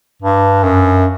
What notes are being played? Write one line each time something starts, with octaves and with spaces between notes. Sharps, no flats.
G2
F#2